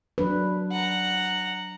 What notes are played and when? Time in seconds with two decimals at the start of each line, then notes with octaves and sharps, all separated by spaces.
0.18 F#3 D4 B4
0.71 F#5 A#5